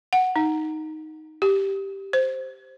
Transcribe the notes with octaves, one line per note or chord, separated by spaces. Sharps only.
F#5
D#4
G4
C5